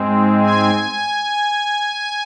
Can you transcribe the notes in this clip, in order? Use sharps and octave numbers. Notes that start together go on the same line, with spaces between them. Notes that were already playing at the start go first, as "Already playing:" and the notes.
Already playing: G#2 G#3 C4
G#5